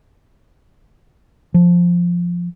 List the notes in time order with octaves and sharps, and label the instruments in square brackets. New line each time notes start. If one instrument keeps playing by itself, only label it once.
[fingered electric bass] F3